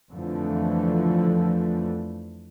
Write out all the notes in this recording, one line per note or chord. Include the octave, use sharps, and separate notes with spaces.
F2 D3 E3 F3 A3